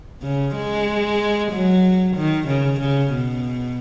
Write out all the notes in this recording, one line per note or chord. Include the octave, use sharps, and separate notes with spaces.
C#3
G#3
F#3
D#3
C#3
C#3
B2